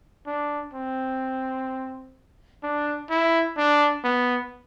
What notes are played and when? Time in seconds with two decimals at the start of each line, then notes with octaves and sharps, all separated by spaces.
0.27 D4
0.74 C4
2.63 D4
3.10 E4
3.57 D4
4.04 B3